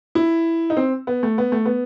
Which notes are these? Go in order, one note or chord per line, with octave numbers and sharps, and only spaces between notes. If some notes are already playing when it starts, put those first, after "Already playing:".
E4
D#4
C4
B3
A3
B3
A3
B3